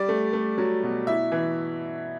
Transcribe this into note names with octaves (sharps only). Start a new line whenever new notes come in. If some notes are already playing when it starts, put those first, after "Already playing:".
Already playing: G3 D5
A3
A3
F#3
B2
E4 E5
E3